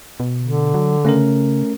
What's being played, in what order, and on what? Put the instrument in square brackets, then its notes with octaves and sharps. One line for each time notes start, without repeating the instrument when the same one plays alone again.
[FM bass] B2
[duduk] D3
[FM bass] F#3
[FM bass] C#3 [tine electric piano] A3 C#4 A#4